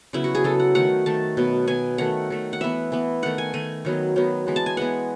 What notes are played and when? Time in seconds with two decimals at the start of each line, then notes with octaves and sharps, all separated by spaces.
0.13 C#3 F#3 B3 E4
0.24 F#4
0.35 G#4
0.44 C#3 F#3 B3 A4
0.60 F#5
0.75 D#3 A3 F#5
1.06 D#3 A3 A5
1.37 B2 F#3 B3
1.67 B2 F#3 B3 G#5
1.98 D#3 A3 F#5
2.30 D#3 A3
2.53 F#5
2.61 E3 B3 E5
2.92 E3 B3
3.22 D#3 A3 F#5
3.38 G#5
3.53 D#3 A3 G#5
3.85 D#3 F#3 B3
4.16 D#3 F#3 B3
4.47 E3 G#3 B3
4.56 A5
4.66 G#5
4.77 E3 G#3 B3 F#5